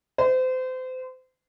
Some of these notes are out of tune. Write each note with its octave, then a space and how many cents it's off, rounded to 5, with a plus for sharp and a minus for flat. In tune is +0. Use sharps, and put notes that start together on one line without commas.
C5 -30